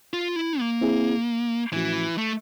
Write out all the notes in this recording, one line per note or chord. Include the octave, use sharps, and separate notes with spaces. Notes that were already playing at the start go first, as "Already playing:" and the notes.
F4
E4
A#3
C4 E4 G#4
A2 E3 F3 A3 C#4 F#4
A3